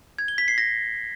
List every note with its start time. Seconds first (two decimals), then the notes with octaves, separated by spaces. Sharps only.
0.19 G#6
0.28 G7
0.38 B6
0.48 C7
0.58 A#6